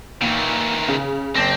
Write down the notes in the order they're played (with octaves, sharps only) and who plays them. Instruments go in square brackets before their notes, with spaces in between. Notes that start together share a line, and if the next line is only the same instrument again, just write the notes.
[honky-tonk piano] A#2 [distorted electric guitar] D#3 E3
[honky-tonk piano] C#3
[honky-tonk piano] F#1 A#6 [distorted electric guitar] C4